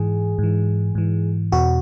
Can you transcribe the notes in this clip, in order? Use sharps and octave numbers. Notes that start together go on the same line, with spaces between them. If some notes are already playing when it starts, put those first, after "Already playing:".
Already playing: G#2 E3 G#4
G#2 E3
G#2 E3
E2 B2 F#4